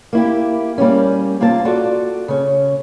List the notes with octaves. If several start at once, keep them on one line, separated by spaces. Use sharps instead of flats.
A#3 E4 G4
G3 A#3 C4 C#4
C3 A#3 C4 F4 C#5 A5
F4 F#4 A4 D5
C#3 C#4